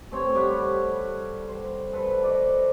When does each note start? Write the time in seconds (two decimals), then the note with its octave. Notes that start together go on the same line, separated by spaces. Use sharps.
0.11 A3 C4 C#5
0.35 G3 C#5 E5 F#5
1.48 C5
1.93 A4 B4 C5
2.24 D5 D#5